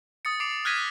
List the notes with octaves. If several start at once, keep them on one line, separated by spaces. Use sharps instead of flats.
D#6 A6 C#7
D6 C7 D7 F7
F6 F#6 G#6 A#6 B6 D#7